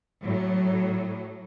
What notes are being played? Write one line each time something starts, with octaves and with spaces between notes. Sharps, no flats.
A2 F#3